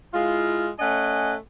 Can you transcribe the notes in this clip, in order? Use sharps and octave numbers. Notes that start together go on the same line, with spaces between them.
G#3 E4 F4
A3 C#4 D#5 F#5 G#5